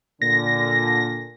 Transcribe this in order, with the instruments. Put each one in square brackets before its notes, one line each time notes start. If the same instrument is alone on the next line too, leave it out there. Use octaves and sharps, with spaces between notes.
[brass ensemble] A#2 D3 [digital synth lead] A#6